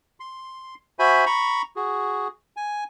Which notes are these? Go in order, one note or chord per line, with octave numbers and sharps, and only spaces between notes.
C6
F#4 C5 E5 G#5 B5
A#5 B5 C#6
F#4 G#4
G#5